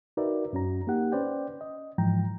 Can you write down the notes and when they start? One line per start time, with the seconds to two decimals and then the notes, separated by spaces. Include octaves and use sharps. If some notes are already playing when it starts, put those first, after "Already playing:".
0.17 D#4 F#4 A#4 B4 D5 E5
0.53 F#2 C#4 F#4 A#5
0.87 A#3 D#4 G4 F#5
1.12 C#4 B4 C5 D5 G5
1.61 D#5
1.98 G#2 E3 F3 G5 A#5